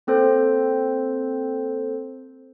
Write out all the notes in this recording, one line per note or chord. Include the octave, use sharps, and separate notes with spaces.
A#3 C4 A4 C5